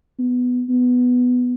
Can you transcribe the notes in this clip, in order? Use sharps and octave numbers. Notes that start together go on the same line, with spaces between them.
B3
B3